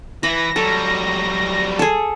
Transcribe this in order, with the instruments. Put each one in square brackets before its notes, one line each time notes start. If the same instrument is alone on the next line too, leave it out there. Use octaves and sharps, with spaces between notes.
[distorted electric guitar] E3 [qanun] B5 [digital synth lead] A#6
[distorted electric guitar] F#3 G3 [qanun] A4
[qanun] G#4 A4